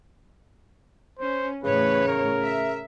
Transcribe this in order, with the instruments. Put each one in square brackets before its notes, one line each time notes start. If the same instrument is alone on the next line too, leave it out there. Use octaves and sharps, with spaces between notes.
[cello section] C#4 [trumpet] C5
[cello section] E2 A2 C#5 [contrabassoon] C#3 [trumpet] B4
[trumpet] A#4
[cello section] E5